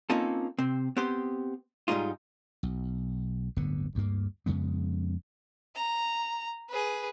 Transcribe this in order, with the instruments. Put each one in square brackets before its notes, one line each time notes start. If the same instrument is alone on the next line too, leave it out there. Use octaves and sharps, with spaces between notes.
[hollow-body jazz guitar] A#3 C4 C#4 D#4 F4 A4
C3 C4
B3 C4 G4 C5
G#2 G3 G#3 D#4 F4
[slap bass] B1
D1 G1 D3 B3
D2 G2 A#3
F2 C#3 G#3 B3
[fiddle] A#5
G#4 B4